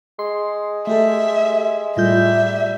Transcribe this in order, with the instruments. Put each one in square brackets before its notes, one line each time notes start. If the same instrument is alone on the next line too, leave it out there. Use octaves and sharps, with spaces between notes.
[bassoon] G#3 [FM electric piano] C6
[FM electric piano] A3 G4 A4 [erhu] E5
[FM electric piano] A2 F4 G6 [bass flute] G3 [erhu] E5